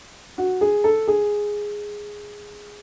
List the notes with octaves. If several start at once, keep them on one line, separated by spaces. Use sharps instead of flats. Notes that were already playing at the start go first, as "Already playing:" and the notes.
F#4
G#4
A4
G#4